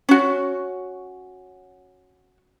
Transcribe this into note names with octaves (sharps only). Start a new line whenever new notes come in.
C#4 F#4